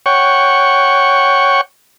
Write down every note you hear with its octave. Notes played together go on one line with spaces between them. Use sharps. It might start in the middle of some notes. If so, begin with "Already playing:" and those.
C#5 F#5 G5 C#6